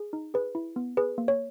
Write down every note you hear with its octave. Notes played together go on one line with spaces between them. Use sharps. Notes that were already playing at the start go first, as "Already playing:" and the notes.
Already playing: G#4
D#4
G#4 B4
E4
B3
G#4 B4
A#3
C#5